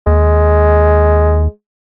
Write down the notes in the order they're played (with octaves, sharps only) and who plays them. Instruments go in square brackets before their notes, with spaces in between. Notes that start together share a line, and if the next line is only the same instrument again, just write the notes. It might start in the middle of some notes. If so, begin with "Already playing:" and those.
[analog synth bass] D#2 [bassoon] G#3